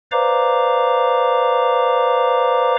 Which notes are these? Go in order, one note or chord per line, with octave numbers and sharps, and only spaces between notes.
B4 C5 D5 F5 A#5 D6